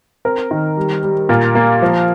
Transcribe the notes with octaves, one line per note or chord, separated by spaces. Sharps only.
C4 A#4
D#3
G3
G3
A#2 A#4
A#3
F3